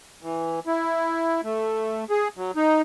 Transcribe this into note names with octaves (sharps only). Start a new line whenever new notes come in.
E3
E4
A3
G#4
F#3
D#4